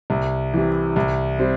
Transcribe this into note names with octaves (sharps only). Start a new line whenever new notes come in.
C2
C3 E3
C2
G3 C4